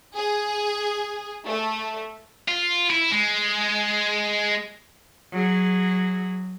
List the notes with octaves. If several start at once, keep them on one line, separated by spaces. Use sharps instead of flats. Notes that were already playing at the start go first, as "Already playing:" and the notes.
G#4
A3
F4
E4
G#3
F#3 G#4